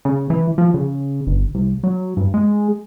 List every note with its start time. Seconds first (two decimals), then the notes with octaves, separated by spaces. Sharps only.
0.05 C#3
0.30 E3
0.58 F3
0.74 C#3
1.27 G1
1.55 C2
1.84 F#3
2.17 G2
2.34 G#3